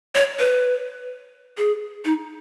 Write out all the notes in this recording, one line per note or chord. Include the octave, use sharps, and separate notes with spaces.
C#5
B4
G#4
D#4